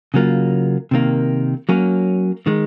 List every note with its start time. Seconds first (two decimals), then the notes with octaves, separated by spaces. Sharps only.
0.14 C#3 F#3 A#3 F4
0.91 C3 D#3 A#3
1.69 F#3 A#3 C#4
2.46 D#3 G#3